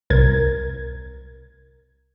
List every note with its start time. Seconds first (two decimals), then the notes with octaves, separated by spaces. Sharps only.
0.10 C2 A#4 G#6